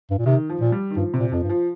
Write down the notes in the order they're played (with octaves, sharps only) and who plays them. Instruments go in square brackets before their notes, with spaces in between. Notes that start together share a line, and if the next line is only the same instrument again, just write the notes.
[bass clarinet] G2
A#2
[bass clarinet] C3 [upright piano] D#3
[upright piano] F3
[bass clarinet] A#2
[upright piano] G3
D#3
[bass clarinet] G2 [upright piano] F3
[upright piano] C3
[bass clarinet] A#2
[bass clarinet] F2 [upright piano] F3
[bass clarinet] G2
[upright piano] F3